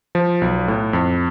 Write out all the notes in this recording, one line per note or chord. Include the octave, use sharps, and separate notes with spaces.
F3
B1
A2
F2